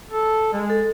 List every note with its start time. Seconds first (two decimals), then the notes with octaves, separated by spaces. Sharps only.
0.11 A4
0.53 G#3
0.70 A4